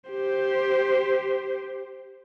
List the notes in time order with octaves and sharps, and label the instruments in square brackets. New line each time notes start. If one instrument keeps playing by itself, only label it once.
[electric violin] G4 C5